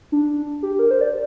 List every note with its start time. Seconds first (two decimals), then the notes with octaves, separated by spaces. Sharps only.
0.12 D4
0.63 G4
0.79 A#4
0.91 C5
1.01 D5